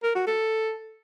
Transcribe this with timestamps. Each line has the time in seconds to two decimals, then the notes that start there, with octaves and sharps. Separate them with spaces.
0.03 A#4
0.15 F#4
0.27 A4